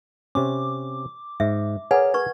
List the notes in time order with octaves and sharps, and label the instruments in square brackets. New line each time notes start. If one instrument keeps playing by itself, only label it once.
[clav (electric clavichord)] C3 C4 C#4 [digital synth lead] D6
[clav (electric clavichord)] G#2 [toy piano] E5
[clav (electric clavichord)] G#4 A#4 D5 [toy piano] B4 F#5 G#5 [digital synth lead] C#5
[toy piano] B4 C#6 [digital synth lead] G#6